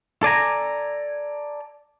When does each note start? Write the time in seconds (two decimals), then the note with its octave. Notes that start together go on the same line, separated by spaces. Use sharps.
0.23 A4 D5 G#5 A#5